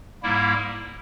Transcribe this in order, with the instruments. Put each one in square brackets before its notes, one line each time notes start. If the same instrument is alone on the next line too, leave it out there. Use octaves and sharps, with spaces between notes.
[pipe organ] G#2 G3 A#3 E4